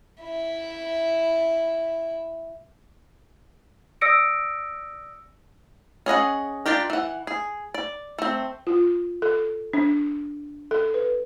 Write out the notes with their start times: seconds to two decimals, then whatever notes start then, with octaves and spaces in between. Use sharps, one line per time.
0.21 E4 E5
4.01 D5 D#6 E6 A#6 C#7 D7
6.06 C#4 G#4 D#5 F#5
6.66 D4 F4 G4 A#4
6.90 E3 F#5
7.27 G#4
7.74 D5
8.18 A3 C4
8.67 F4
9.22 A4
9.73 D4
10.71 A4
10.94 B4